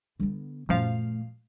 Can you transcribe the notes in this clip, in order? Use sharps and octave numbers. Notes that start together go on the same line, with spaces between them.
D3 B3
F#2 A#2 F3 A3 F5